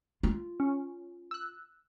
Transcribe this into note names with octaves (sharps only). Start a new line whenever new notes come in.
F4
C#4
E6 F#6